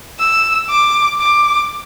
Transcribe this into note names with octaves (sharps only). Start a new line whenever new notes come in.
E6
D6
D6